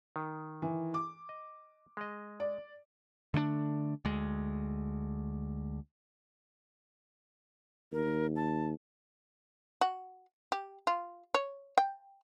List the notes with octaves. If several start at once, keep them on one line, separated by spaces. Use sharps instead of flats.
D#3
E3
D6
D#5
G#3 D#5
D5
D3 A3 A#3 D4
D2 G#3
D#2 A#4
A5
F#4
G4
F4
C#5
G5